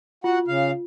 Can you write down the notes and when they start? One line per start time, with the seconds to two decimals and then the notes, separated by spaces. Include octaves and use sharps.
0.24 F4 F#4 F#5
0.48 C#3 F5